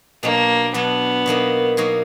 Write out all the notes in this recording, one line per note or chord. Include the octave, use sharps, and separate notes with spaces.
B2 F#3 A#3 D4
B2 F#3 B3 D4
B2 F#3 A#3 D#4
B2 F#3 A#3 D#4